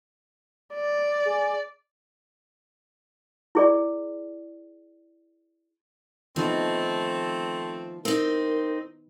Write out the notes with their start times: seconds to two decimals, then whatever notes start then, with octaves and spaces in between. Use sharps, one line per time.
0.74 D5
1.26 G#4
3.55 E4 G#4 D5
6.36 D#3 F3 A3 B3 C4
8.05 C4 D#4 A#4